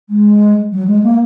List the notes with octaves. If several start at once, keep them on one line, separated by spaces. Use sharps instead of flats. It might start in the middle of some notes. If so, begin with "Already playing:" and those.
G#3
F#3
G#3
A#3